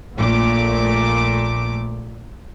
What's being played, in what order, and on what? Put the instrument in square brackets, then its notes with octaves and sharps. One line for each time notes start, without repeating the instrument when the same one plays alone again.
[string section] A#1 A#2 A3 D6